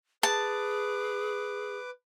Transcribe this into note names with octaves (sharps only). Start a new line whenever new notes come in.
G#4 B4 A5 D6